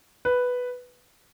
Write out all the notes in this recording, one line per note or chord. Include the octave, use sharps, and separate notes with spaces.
B4